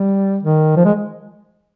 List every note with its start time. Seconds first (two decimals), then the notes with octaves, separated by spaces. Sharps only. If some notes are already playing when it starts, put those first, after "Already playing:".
Already playing: G3
0.43 D#3
0.76 F3
0.85 G#3